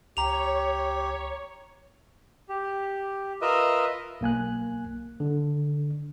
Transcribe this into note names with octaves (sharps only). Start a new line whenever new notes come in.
C#2 G4 C#5 A#5 F7
G4
F4 A#4 B4 D#5 E5
B1 A#3 G#5 F#6
D3